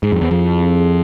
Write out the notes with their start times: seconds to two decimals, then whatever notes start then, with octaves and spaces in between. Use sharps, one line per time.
0.03 G#2 G#4
0.12 F2
0.21 E2 C5
0.31 F2
0.40 E4
0.58 C4
0.77 G#4